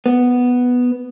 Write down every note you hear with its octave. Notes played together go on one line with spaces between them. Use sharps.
B3